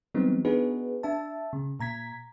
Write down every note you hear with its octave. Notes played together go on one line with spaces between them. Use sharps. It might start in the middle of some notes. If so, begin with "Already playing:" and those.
E3 F#3 G3 B3 C4 D#4
B3 D4 D#4 F#4 G#4 B4
D4 E5 A5
C#3
A#2 A#5 G#6 B6